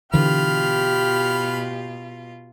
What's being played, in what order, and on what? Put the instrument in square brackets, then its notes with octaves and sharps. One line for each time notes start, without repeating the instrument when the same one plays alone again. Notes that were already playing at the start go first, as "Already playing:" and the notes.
[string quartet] B2 F4 [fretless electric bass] D3 E3 [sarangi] G4 [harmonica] B5 F6